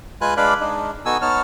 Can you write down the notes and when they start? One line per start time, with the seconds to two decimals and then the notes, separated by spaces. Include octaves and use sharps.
0.21 G#3 F4 B4 G#5 F#6
0.37 G#3 D4 B4 D5 F5 B5
0.60 G#3 D4 D#4
1.06 B3 D#4 F#4 A4 G#5 E6
1.22 B3 D#4 C#5 A5 F6